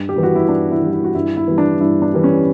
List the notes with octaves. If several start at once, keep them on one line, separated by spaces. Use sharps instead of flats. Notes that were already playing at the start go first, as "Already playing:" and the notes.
Already playing: G2
G4
E3 G3
F#4
E4
G2 D4
E4
E3 G3
E4
F#4
G2 E4
E4
E3 G3
D4
G2 E4
D4
E3 G3
C#4